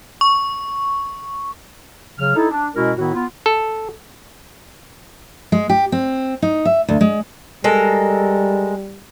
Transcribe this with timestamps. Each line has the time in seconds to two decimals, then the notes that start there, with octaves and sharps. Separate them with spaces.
0.21 C#6
2.19 C#3 F#3 F6
2.36 D#4 E4 A4
2.51 D4
2.75 B2 G#3 C#4 E4 F#4 A#4
2.97 A2 D#3 B3 E4 F#4
3.14 B3 F4
3.46 A4
5.52 G#3
5.70 G4
5.92 C4
6.42 D#4
6.65 E5
6.88 D2
7.01 G#3
7.64 G3 G#3 A4 A#4